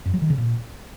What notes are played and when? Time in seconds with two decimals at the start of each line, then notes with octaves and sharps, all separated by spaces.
0.06 F#2
0.14 F#3
0.22 D#3
0.30 C#3
0.38 A#2